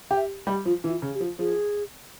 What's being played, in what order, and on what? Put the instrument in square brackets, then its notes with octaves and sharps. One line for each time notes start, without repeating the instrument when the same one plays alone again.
[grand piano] G4
[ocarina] E5
[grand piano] G3
[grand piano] F3 [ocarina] F4
[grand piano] E3
[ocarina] F4
[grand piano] C#3
[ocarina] G4
[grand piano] F3
[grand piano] F3 [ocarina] G#4